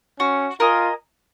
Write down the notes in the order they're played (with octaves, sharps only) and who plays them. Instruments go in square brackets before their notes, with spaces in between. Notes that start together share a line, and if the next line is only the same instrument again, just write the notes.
[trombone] C#4 [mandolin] F#4
[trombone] F4 [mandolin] A#4 D#5 G#5